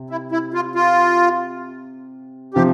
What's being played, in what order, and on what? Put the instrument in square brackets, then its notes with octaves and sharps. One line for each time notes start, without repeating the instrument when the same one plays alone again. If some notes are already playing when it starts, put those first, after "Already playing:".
Already playing: [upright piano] C3
[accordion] E4
E4
F4
F4
[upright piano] C3 F3 [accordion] G4